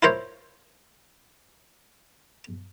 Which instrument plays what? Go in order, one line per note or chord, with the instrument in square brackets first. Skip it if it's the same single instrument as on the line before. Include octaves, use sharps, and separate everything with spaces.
[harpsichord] E4 F4 A#4 C5 C#5